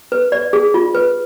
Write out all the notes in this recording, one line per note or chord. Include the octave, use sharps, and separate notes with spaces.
B4
D5
G#4
F4
B4